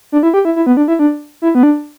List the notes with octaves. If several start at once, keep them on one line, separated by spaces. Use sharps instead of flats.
D4
E4
G4
E4
E4
B3
D4
E4
D4
E4
B3
D4